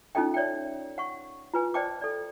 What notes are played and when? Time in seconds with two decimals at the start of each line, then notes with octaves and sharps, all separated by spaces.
0.15 C#4 D#4 F4 A4 D#5 G5
0.34 C#5 D5 E5 G5
0.98 F#5 C#6
1.54 F4 B4 G#5
1.74 C5 D5 D#5 G5 A5 D6
2.01 A4 D5